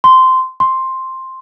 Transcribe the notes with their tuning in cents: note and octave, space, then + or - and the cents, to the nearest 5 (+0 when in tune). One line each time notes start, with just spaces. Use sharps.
C6 -15
C6 +5